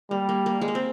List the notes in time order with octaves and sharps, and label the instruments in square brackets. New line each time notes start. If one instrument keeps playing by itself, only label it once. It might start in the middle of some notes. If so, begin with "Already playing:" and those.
[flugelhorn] G3 [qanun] A#3
[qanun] A#3
A#3
G#3
A#3
C4